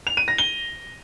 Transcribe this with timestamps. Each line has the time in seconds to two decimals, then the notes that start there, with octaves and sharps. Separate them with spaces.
0.07 F7
0.17 D#7
0.28 A#6
0.38 G7